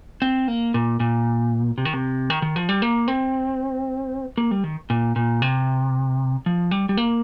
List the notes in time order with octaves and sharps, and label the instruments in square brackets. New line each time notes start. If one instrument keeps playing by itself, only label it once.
[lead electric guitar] C4
A#3
A#2
A#2
C3
D#3
C3
D#3
D#3
F3
G3
A#3
C4
A#3
G3
D#3
A#2
A#2
C3
F3
G3
G3
A#3